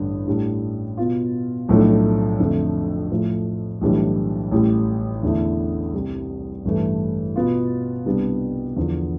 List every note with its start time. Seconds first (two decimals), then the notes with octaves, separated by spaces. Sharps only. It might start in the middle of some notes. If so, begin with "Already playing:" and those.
Already playing: A1 G2 D3
0.27 A2 G3 D4
0.97 B2 B3 F4
1.68 B1 A2 F3 A3 D4
2.39 F2 D3 F3 A3
3.10 A2 F3 A3
3.81 B1 A2 E3 G3 D4
4.51 A1 A2 G3
5.23 E2 D3 A3 E4
5.93 C2 C3 G3
6.65 A1 G2 E3 A3
7.36 B2 B3 F4
8.05 C2 C3 G3 B3 D4
8.76 E2 D3 F3 B3